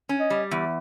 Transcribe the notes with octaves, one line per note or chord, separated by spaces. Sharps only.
C#4
D#5
G3
E2